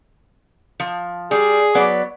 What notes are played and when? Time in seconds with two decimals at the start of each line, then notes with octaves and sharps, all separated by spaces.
0.80 F3
1.31 G3 G#4
1.75 F#3 B3 D5